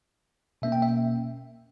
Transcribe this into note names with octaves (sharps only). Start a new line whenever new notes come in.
B2 A#3 C#4 E5
G5
E5